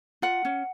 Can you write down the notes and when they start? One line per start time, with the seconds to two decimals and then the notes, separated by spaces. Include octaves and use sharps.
0.22 F4 F#5
0.45 C#4